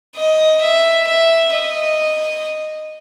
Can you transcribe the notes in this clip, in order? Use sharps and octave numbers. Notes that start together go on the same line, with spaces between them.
D#5
E5
E5
D#5